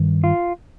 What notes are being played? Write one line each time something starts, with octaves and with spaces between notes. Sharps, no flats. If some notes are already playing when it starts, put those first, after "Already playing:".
Already playing: G2 D#3
F4